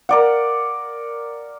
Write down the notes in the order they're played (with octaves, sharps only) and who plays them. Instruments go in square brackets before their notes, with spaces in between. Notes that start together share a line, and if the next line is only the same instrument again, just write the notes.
[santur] A#4 D5 F#5